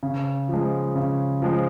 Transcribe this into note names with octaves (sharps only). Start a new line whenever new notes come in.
C#3
F3 G#3
C#3
F3 G#3